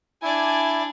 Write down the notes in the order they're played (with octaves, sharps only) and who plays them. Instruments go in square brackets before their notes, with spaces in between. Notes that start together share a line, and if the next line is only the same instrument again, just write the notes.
[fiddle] D4 D5 [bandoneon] E4 [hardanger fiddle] G#5